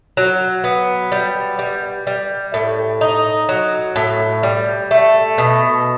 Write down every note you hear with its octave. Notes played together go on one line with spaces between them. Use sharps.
F#3
B3
G3
G3
G3
A2
D#4
F#3
A2
G3
A3
B2